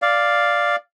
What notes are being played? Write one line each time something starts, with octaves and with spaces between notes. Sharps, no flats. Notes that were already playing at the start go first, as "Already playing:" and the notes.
D5 F5